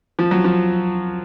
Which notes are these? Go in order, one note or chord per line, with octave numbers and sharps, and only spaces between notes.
F3
F#3
F3